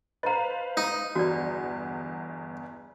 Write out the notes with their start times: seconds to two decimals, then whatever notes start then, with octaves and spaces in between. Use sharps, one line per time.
0.23 B4 C5 D#5 F5 A#5
0.77 D#4
1.15 G1 E2 F#4 D5